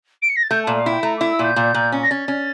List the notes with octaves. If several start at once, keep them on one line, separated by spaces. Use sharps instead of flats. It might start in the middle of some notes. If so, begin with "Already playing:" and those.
D7
C#7
A#6
A6
A3 G6
A#2 A5
F5
E4 G5
A3 A#5
E4 D6
E6
A#2 G6
A#2
A#2
C#4
A#6
C#4 A6
C#4